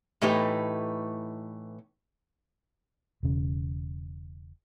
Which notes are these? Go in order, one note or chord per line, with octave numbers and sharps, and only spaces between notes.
A2 E3 A3 D#4 G4 B4
E1 C#3